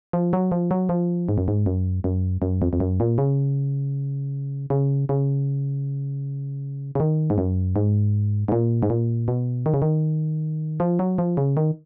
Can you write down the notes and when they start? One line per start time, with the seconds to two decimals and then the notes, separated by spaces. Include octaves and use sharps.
0.13 F3
0.33 F#3
0.52 F3
0.71 F#3
0.89 F3
1.29 G#2
1.38 F#2
1.48 G#2
1.66 F#2
2.04 F#2
2.42 F#2
2.62 F2
2.73 F2
2.80 F#2
3.00 A#2
3.18 C#3
4.70 C#3
5.09 C#3
6.95 C#3
7.00 D#3
7.30 G#2
7.38 F#2
7.76 G#2
8.48 G#2
8.52 A#2
8.83 G#2
8.90 A#2
9.28 B2
9.66 D#3
9.74 C#3
9.82 D#3
10.80 F3
10.99 F#3
11.18 F3
11.37 C#3
11.57 D#3